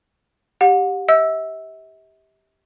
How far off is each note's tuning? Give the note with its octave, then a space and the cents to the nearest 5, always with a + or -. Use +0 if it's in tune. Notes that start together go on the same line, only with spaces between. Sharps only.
G4 +0 F#5 -35
E5 -40 E6 +0